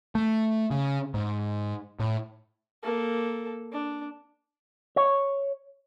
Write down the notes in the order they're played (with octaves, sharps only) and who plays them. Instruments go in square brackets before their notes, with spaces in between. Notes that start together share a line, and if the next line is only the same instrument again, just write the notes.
[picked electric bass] A3
C#3
G#2
A2
[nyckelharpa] A#3 A4
D4
[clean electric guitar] C#5